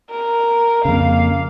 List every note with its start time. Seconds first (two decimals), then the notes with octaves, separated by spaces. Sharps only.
0.10 A#4
0.85 F2 C#3 A#3 F5